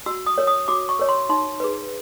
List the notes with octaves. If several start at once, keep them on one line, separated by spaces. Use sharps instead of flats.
F#4 E6
D#6
A#4 C#5
D#6
F#4 D6
C#6
A#4 C#5
C6
D#4 C6
G#4 B4